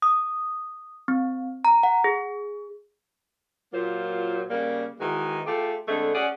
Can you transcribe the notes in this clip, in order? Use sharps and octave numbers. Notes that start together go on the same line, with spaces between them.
D#6
C4
A#5
F#5
G#4
A#2 F#3 A#3 F4 C5
C#3 G3 A#3
D#3 E3 G#3 F#4 B4
A3 F4 G4 G#4
D3 G#3 A3 C4 D4
C#4 G#4 D5 F#5